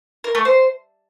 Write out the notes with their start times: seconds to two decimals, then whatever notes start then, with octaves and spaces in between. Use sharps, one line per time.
0.24 A#4
0.35 A3
0.45 C5